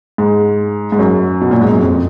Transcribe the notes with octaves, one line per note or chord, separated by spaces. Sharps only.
G#2
G#2
F#2
B2
A#2
G#2
F#2
F2